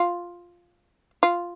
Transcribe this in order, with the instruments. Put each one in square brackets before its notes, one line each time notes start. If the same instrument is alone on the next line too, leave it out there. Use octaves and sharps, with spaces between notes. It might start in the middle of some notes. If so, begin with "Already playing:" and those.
Already playing: [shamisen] F4
F4